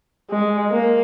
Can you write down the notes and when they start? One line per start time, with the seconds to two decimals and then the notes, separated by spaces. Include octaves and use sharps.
0.30 G#3
0.71 A#3